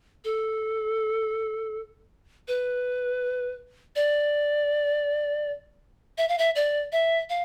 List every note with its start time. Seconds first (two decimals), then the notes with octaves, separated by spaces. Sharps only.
0.24 A4
2.48 B4
3.96 D5
6.18 E5
6.29 F5
6.38 E5
6.56 D5
6.92 E5
7.30 F5